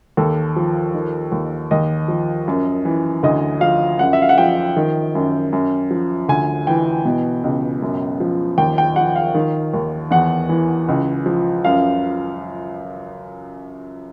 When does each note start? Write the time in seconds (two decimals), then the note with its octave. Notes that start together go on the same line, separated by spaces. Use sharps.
0.17 D#2 A4
0.56 F3
0.94 D#3
1.32 D#2
1.71 D#2 D#5
2.08 F3
2.48 F#2
2.85 E3
3.23 D2 D#5
3.61 F3 F5
3.99 F#2 F#5
4.13 E5
4.22 F5
4.29 F#5
4.38 F3 G5
4.76 D#3
5.15 F#2
5.53 F#2
5.90 F3
6.29 D2 G#5
6.67 E3 G5
7.05 B2
7.43 C#2
7.82 F#2
8.20 F3
8.58 D#2 G5
8.78 G5
8.96 F3 F#5
9.16 F5
9.34 D#3
9.74 D#2
10.11 E2 F#5
10.49 E3
10.88 C#2
11.26 F3
11.65 F#2 F5